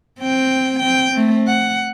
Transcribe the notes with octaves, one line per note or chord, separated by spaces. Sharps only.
C4 G5
C4 G5
A3 C4
F#5